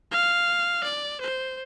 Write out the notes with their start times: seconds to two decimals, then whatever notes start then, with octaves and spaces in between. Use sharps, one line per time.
0.11 F5
0.83 D5
1.21 C5